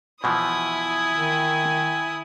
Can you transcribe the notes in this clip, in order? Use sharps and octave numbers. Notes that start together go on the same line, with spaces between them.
B2 E3 F3 E4 G#5 D#6
D#3